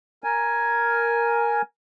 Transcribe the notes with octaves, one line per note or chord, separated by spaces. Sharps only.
A#4 G#5